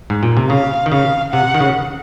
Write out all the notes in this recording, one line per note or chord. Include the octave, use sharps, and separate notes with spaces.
G#2
A#2
C3
C#3 F5
D#3
C#3 F5
C3 F#5
D#3
C#3